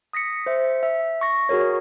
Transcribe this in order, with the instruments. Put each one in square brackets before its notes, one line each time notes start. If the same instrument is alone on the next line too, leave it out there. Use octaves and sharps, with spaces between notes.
[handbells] D#6 A#6 B6 C#7
C5 E5
E5
C#6 A#6
F#4 G#4 A#4 C#5